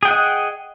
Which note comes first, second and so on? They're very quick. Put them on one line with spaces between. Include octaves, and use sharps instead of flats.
G#4 G5 F#5 D#5